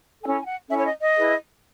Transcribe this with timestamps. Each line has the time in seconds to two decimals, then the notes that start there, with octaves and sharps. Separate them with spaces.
0.22 C#4 E4 A4 G#5
0.40 G#5
0.46 F#5
0.69 C#4 E4 A4 E5
0.78 C#5
0.85 D#5
1.01 D#5
1.17 E4 G#4 B4